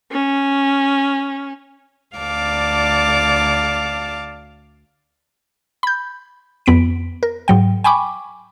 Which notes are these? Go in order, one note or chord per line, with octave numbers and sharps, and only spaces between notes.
C#4
D2 D5 F5 A5 D6
B5 G6
F2 B3 B6 D7
A#4
G#2 F#3 G5
G5 G#5 B5 C#6 D6